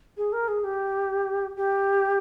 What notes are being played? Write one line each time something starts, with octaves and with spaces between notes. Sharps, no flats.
G#4
A#4
G#4
G4
G4